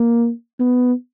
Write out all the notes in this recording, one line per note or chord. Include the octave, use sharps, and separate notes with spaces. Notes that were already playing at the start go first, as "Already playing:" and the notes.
Already playing: A#3
B3